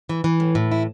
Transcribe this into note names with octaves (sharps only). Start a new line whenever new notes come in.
E3
E3
A2
A2
E4